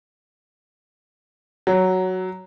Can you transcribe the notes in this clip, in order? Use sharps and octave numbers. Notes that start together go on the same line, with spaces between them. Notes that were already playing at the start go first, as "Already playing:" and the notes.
F#3